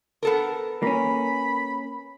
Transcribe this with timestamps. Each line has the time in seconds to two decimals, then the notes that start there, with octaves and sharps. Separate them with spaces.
0.23 B3 A4 A#4
0.83 A#3 C#4 B5